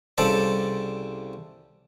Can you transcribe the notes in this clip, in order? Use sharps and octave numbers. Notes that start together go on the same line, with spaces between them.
C2 C#3 A4 C5 D5 A5